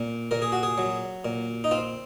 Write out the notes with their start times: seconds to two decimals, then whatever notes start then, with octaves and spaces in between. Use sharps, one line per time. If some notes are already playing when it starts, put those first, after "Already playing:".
Already playing: A#2
0.31 A#2 A#4
0.42 G#4
0.52 F#4
0.63 G#4
0.78 F#3
1.25 A#2
1.64 D#4
1.71 C4 F4